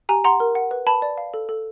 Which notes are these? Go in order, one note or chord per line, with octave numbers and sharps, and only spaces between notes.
G4 G#5 A#5
F#5 A#5 C6
A#4
F#5
B4
B4 A5 B5
D5
F5
A4
A4